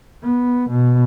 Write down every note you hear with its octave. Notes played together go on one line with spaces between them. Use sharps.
B3
B2